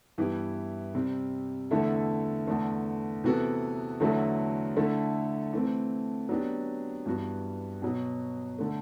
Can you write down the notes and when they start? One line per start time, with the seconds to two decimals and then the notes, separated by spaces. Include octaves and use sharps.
0.18 G2 E3 B3 E4 G4
0.94 C3 G3 C4
1.71 E2 D3 A3 E4 A4
2.47 E2 D3 A3
3.24 C3 E3 B3 F#4 A4
4.00 E2 D3 F#3 A3 E4
4.76 D3 A3 E4
5.53 E3 A3 C4
6.29 F#3 B3 D4 G4
7.06 G2 E3 G3 B3 F#4
7.82 B2 F#3 B3
8.58 D3 A3